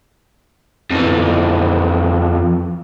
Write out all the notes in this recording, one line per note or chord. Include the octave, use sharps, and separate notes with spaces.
F2 E3